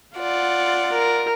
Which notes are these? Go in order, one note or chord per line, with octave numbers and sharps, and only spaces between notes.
F4 D5 F#5
A#4